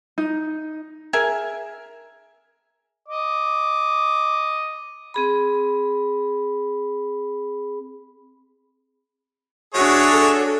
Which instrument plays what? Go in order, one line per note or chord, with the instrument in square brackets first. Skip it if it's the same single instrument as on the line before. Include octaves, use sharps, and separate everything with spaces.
[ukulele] D#4
[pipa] G#4 A#4 E5 G#5
[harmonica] D#5 D6
[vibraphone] C4 G#4 B5
[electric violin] D4 F#4 [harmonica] G#4 C#5 E5
[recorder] A4